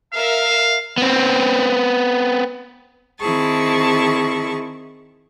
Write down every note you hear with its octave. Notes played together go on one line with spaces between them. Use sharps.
A#4 E5 F5
B3 C4
D#3 C4 E4 G#4 A5 C#6